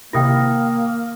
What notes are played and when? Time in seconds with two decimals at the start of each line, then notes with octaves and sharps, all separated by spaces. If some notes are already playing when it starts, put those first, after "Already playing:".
0.13 C3 D#3 A#3 E4 G5 D#6 A#6